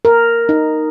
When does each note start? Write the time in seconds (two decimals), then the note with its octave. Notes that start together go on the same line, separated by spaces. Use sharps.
0.05 A#4
0.49 D#4